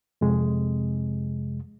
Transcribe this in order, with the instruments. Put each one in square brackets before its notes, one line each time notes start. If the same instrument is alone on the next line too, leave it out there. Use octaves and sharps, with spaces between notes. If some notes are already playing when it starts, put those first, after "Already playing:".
[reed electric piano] F2 C3 G#3